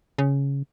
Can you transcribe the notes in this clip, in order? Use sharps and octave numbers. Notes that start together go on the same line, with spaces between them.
C#3